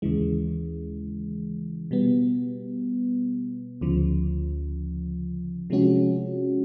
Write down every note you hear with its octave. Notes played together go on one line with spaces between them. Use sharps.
D#2 C#3 E3 G#3
B2 G3 B3
D2 C#3 F3
C3 F3 G#3 C#4 F#4